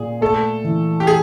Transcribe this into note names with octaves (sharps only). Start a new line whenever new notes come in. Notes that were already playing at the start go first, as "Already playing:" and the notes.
Already playing: A#2 G#4
A3 A4
E3
G4
G#4